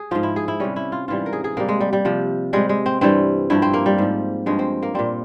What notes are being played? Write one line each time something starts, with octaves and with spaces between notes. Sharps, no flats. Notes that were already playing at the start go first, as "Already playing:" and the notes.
Already playing: G#4
G#2 F3 F4
E4
G#4
E4
C3 G3 C#4
E4
F4
G#2 E3 G3 F4
A#4
G#4
G#4
C3 G3 A#3
G#3
G3
G3
C3 F3
C3 G3 G#3
G#3
C4
G2 E3 G3 C4
G2 F3 E4
C4
A#3
G3
G#2 F3
G2 F3 G#3
C4
A#3
A#2 G3 C4